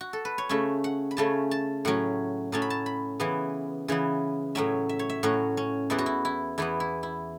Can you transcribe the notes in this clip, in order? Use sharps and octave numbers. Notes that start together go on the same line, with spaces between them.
F#4
A4
B4
C#5
C#3 A3 C#4 E5
F#5
B5
C#3 A3 C#4 A5
A5
A2 F#3 C#4 F#5
A2 F#3 C#4 A5
B5
A5
B5
C#3 E3 B3
C#3 E3 B3
A2 F#3 C#4 E5
E5
C#5
E5
A2 F#3 C#4 F#4
C#4
E2 E3 B3 E4
F#4
E4
E4
E2 E3 B3 E4
E4
E4